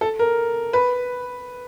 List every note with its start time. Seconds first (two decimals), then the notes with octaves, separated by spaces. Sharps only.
0.01 A4
0.19 A#4
0.73 B4